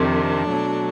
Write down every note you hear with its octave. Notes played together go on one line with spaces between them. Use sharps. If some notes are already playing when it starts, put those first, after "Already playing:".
Already playing: F2 C3 D#3 D4
B2 F#3 A3